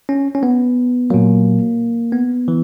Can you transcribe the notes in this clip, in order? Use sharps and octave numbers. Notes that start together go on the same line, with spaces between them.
C#4
C#4
B3
A#2 F#3 A#3
B3
E3